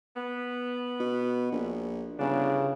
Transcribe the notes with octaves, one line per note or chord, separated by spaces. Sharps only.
B3
B2
A#1
G1 C#3 F3 F#3 D4